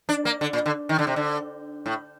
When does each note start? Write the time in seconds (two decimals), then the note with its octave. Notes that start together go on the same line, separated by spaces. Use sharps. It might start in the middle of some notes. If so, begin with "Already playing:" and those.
0.09 D4
0.25 A#3
0.41 D3
0.53 A#2
0.66 D3
0.89 D#3
0.99 D3
1.07 C3
1.16 D3
1.86 A2